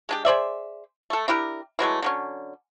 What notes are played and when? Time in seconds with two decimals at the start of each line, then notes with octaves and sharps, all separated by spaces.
0.09 G#3 D4 G4
0.25 G#4 C5 D5 E5
1.10 A3 A4
1.28 D4 E4 G4 A#4
1.79 E3 F#3 G#3 A3
2.02 D3 F#3 C#4